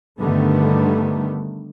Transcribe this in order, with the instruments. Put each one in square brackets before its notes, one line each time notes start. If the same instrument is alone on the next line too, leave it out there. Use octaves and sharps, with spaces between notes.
[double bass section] G2 D3 D#3 G3 A3 B3